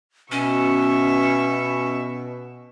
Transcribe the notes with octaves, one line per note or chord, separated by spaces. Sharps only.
B2 C#4 E5 C#6